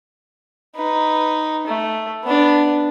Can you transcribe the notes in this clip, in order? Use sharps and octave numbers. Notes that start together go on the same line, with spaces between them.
D#4 B4
A3
B3 D4